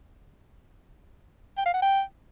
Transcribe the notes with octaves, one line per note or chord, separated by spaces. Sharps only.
G5
F5
F#5
G5